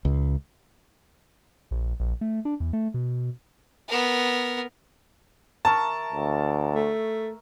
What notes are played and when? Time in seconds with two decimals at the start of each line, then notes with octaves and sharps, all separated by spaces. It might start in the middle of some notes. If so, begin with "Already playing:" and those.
0.05 C#2
1.71 A#1
2.00 A#1
2.21 A3
2.45 D4
2.60 E2
2.73 A3
2.94 B2
3.89 B3 A#4
5.65 A#4 E5 A5 C#6
6.13 D2
6.75 A3